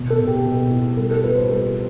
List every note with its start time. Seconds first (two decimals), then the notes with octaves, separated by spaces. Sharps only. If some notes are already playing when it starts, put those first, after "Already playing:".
Already playing: B2
0.10 A4
0.19 B2
0.27 G4
0.46 B2
0.71 E4
0.97 G3 A4
1.11 A4
1.24 F4 B4
1.36 C5
1.50 G3 A4